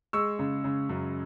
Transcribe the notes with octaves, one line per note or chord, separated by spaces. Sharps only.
G#3 C#6 E6
C#3
C#3
F#2